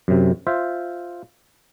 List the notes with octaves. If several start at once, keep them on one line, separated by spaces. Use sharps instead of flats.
F#2 C3
F4 C5 E5